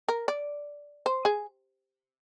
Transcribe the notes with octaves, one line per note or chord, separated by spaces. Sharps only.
A#4
D5
C5
G#4